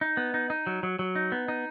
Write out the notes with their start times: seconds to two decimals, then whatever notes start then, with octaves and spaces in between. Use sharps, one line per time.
0.01 D#4
0.17 B3
0.34 D#4
0.50 D#4
0.67 F#3
0.83 F#3
0.99 F#3
1.15 D#4
1.32 B3
1.48 D#4